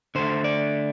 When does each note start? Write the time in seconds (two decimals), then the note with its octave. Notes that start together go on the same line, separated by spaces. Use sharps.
0.15 D3 A3 C5
0.44 D5